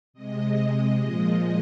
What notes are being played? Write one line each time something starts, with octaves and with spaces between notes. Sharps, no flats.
C3 G#3 D#5
A#2 F3 G#3